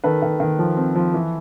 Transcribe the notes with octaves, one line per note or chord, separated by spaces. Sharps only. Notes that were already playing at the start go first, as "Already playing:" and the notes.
D#3 A4 B4
D#3
D#3
F3
C4
F3
E3